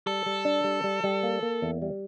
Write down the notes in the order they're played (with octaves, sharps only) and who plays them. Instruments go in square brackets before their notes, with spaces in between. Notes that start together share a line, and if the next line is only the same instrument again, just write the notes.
[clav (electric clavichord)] G3 [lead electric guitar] A4
[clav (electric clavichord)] G3
D4
G3
G3
G3
A#3
A#3
E2
G3